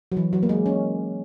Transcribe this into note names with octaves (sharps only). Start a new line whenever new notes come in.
F#3
E3
F#3
A#3
G#3
C#4